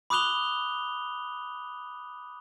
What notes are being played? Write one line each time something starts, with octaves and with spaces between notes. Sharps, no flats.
B5 D6 D#6 F#6 F7 G7